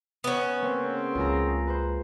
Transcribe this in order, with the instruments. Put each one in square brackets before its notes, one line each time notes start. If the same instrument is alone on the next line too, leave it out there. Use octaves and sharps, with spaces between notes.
[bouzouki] B3 C#4 [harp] B4
[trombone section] C#3 C4 [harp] A#3
[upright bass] C#2 [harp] F4 G#4 A#5
[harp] B4 C5